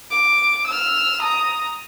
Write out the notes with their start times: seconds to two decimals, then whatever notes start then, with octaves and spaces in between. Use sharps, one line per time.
0.11 D6
0.68 E6 F6
1.22 A#5 D#6